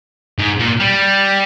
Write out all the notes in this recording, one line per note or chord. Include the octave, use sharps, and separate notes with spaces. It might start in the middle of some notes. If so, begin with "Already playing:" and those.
G#2
A#2
G3